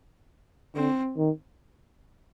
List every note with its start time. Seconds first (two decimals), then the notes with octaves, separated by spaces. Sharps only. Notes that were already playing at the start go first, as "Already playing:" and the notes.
0.75 D3 C4
1.17 D#3